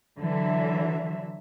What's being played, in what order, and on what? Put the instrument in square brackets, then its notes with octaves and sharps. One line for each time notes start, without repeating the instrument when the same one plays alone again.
[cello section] D3 E3 F#3 E5